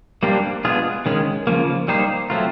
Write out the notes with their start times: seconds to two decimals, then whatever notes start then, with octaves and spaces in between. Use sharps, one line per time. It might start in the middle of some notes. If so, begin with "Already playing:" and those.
0.23 G3 A#3 D4 G4 C5
0.65 G#3 B3 D4 F4 G#4
1.06 D#3 G#3 C#4
1.47 C#3 F3 A#3
1.88 G3 A#3 D#4 G4 C5
2.30 F#3 A3 C4 F4